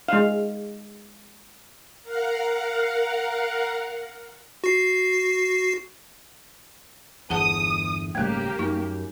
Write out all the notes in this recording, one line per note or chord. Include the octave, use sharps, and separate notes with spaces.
G#3 F5
A#4 F5 F#5
F#4 C7
G1 E2 G#4 F#5 A5 D#6
D#1 G#1 C#3 G3 A3 A#3 G4
F#2 D#4